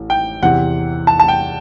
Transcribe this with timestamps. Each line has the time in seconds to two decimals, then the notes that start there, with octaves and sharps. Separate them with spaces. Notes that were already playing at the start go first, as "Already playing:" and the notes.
Already playing: A1
0.10 G5
0.42 E2 C3 E3 F#5
1.07 A5
1.20 A5
1.28 G5